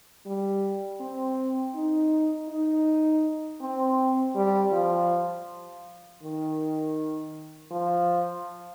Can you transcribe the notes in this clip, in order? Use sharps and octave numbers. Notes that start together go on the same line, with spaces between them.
G3
C4
D#4
D#4
C4
G3
F3
D#3
F3